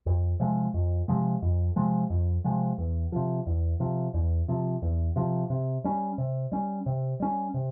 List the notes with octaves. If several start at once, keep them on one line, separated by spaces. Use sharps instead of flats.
F2
C3 F3 G#3
F2
C3 F3 G#3
F2
C3 F3 G#3
F2
C3 F3 G#3
E2
C3 F3
E2
C3 F3
E2
C3 F3
E2
C3 F3
C3
G3 C#4
C3
G3 C#4
C3
G3 C#4
C3